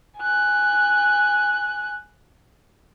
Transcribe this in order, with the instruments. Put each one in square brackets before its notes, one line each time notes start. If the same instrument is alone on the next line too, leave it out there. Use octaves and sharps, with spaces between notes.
[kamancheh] G#5 F#6